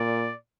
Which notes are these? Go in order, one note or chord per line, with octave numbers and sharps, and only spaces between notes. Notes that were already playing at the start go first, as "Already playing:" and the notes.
Already playing: A#2 D5